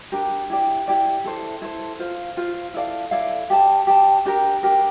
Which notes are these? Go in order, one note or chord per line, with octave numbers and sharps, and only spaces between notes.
D4 G4 A#4
E4 G4 D5
E4 G4 D5
E4 A4 C5
E4 A4 C5
F4 C5 F5
F4 C5 F5
E4 A4 D5 F5
E4 A4 D5 F5
G4 D5 A5
G4 D5 A5
D4 G4 A#4
D4 G4 A#4